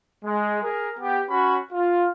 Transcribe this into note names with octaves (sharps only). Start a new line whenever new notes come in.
G#3
G#4 A#4
B3 G4
C#4 F#4 B5
F4